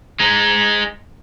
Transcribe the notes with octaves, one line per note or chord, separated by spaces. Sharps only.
G#3 D#4